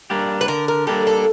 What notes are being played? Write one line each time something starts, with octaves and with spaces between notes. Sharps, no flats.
G3 A#3 D4 G4
B4
D3 A#4
A#4
G3 A#3 D4 G4 A4
A4